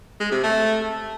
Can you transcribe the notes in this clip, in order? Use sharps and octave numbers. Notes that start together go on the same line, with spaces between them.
G#3
C3
A3